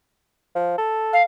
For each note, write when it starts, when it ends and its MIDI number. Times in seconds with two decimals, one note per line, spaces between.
0.55 0.74 53
0.78 1.21 69
1.13 1.22 77